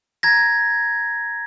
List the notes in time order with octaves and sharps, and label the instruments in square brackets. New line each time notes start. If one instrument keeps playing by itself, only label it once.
[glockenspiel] A#5 G#6 A#6